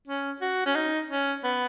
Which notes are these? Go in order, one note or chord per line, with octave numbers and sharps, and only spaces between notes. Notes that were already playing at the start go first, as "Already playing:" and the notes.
C#4
F#4
C#4
D#4
C#4
B3